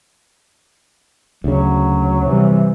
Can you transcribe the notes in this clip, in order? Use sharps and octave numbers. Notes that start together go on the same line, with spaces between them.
D2 C#3 F#3
C3 E3 G3